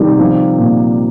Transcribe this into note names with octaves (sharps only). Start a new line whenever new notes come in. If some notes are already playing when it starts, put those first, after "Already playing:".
Already playing: C3 D#3 G3 G4
F3
A#2